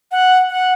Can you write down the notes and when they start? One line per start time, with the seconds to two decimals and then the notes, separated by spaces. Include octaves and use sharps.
0.11 F#5
0.49 F#5